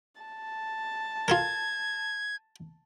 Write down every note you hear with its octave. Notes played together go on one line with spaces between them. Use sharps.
A5
F4 A4 A#4 G#6